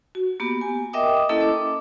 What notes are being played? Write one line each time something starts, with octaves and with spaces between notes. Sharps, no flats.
F#4
A#3 B3 G4
G#5
A#4 D#5 E5 G5 D6 D#6
A#3 C#4 E4 A4 D#5 A5
D6